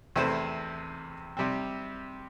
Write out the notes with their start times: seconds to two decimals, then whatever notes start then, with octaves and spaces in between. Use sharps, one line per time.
0.16 E2 C3 A3 E4 C5
1.37 C3 G3 C4